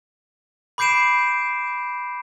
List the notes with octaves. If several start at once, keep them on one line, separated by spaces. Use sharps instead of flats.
B5 D6 G6 C7 D7 E7